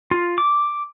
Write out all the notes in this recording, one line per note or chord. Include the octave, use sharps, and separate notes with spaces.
F4
D6